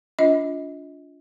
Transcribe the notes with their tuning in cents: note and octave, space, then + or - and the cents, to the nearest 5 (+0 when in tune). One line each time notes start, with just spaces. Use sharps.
D4 -30 F4 +0 D#5 +35